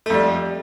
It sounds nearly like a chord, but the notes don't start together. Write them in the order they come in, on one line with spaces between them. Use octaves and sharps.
A3 F2 G3